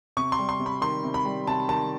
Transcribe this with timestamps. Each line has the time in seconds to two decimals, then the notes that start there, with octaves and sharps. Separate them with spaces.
0.17 C3 C#6
0.32 C6
0.39 G3
0.49 C6
0.59 C3
0.66 B5
0.81 D#3 C6
1.03 C3
1.14 B5
1.25 G3
1.47 C3 A5
1.69 D#3 A5